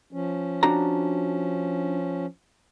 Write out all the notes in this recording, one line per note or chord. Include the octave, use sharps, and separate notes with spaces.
F3 C#4
D4 F#4 A#5